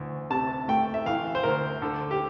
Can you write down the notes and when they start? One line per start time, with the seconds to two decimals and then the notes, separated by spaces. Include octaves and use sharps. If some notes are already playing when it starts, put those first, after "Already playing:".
Already playing: D2 E3
0.30 C3 A5
0.68 A3 G5
0.94 E5
1.06 E3 F5
1.35 C5
1.43 D2 A#4
1.82 D3 A4
2.11 G4